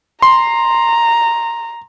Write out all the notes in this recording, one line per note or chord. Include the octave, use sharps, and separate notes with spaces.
A#5 C6